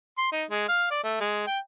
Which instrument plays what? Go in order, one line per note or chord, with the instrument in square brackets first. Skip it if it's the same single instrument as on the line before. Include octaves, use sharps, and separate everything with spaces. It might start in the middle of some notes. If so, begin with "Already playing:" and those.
[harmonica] C6
D#4
G#3
F5
D5
A3
G#3
G5